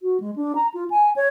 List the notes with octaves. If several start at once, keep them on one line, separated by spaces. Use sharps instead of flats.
F#4
G#3
D4
A#5
F4
G#5
C#5